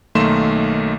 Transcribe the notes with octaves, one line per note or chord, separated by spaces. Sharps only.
B1 D#3 A3 A#3 C6 E7